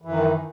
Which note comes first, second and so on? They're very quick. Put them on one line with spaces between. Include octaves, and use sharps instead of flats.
E3 F#2 D#3